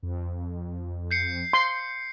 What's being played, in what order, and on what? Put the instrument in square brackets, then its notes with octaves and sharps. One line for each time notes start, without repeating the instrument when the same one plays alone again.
[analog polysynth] F2
[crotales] G6 C7 C#7
[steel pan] C6